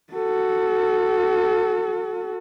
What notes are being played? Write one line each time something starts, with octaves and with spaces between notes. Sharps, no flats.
F#4 A4